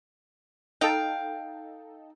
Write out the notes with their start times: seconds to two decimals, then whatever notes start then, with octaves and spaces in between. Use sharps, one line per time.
0.81 D#4 A4 F5 G5